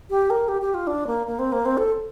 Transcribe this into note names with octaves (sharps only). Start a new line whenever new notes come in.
G4
A#4
G4
G4
F4
D4
A#3
A#3
C4
A#3
C4
A4